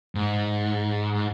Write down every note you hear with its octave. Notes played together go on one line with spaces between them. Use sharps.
G#2